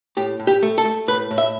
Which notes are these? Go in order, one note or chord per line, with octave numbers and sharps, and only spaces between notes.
A2 G4
A2
G4
A3
A4
A3
A2 B4
A2
E5